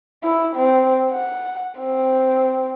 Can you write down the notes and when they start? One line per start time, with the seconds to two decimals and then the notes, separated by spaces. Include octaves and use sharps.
0.23 E4
0.56 C4
1.11 F#5
1.80 C4